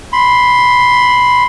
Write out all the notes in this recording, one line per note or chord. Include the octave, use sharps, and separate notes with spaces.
B5 C6